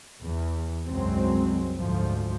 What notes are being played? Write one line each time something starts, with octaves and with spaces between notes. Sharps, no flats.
E2
C2 F#2 F#3 G#3 C4
D2 G#2 F3